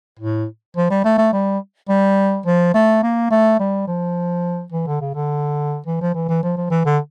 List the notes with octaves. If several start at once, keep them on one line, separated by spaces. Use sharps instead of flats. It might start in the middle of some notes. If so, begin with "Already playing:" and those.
A2
F3
G3
A3
A3
G3
G3
F3
A3
A#3
A3
G3
F3
E3
D3
C#3
D3
E3
F3
E3
E3
F3
F3
E3
D3